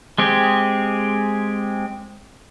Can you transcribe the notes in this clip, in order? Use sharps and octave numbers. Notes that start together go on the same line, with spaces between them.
G#3 C4 G4 G#4